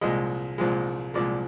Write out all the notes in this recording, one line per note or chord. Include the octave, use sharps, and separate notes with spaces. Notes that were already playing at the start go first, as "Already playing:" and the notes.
C2 A#2 F3 G#3 D#5
C2 A#2 F3 G#3
C2 A#2 F3 G#3 D5